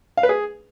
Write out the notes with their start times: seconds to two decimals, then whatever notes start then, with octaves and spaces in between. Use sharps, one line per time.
0.17 F5
0.23 B4
0.29 G#4